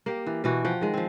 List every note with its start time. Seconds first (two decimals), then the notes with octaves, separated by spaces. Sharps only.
0.06 A#3 G4
0.26 E3
0.44 B2 E3 F#4
0.65 F3 F#5 G5
0.81 D#3 G#3
0.94 F3 C4